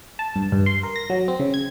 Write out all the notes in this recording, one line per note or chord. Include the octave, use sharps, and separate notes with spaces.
A5
G2
G2
C6
A#4
A#6
F#3
C4
C#3
G#6